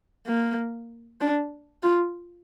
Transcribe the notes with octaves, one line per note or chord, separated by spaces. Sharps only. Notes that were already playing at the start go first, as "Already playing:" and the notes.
A#3
D4
F4